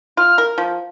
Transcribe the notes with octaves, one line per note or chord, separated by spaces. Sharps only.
F4 F6
A#4
F3